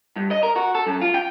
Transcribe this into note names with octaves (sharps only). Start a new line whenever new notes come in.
G2
D#5
A#4
F#4
A4
F#2
F4
G5